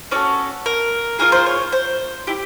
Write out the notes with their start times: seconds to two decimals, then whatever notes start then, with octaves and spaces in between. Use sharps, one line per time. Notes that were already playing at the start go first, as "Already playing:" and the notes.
0.11 C#4 F#4 A4 D5
0.66 A#4
1.19 A#3 D4 F4 G#4 A#4
1.32 C5
1.46 C#5
1.72 C5
2.27 E4 G4